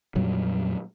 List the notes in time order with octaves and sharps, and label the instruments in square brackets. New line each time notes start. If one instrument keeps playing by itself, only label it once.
[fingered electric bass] F2 A#2 F#3 G3